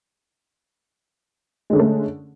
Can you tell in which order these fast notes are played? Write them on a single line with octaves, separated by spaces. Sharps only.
G#3 D3 C#4 A3